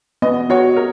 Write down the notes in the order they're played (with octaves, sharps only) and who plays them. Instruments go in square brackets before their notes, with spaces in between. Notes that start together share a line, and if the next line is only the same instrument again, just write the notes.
[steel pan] B3 [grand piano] D#5
[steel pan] F#4 [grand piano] C#5
[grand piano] A#4